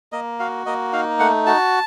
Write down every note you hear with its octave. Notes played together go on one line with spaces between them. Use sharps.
A#3 D#5
F#4 F5
A#3 D#5
D#4 F5
A3 F#5
F#4 A5